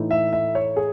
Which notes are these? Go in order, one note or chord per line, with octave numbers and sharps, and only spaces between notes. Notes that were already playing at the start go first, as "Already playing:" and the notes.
Already playing: A2 E3 A3 D#4
E5
E5
C#5
G#4